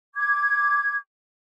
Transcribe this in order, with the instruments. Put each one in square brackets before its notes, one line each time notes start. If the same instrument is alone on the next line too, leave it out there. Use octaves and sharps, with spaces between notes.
[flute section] D6 G#6